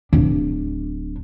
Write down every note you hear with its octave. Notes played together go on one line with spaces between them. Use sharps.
D1 D4